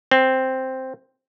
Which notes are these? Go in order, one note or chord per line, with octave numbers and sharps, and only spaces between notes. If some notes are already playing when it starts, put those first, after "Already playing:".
C4